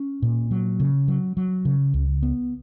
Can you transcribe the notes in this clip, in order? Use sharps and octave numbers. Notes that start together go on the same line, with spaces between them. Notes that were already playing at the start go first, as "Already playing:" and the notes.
Already playing: C#4
A#2
F#3
C#3
F#3
F#3
C#3
C#2
B3